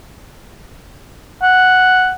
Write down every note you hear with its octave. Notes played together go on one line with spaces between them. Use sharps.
F#5